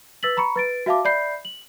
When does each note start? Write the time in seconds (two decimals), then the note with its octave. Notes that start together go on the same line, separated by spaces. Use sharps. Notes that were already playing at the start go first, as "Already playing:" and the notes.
0.23 B4 E6 A6 B6 F#7
0.37 A#5 B5 C#6 C#7
0.56 B4 A6 D7
0.86 F#4 E5 F5 A5 D6
1.05 D5 E5 B5 G6 C7
1.45 F#7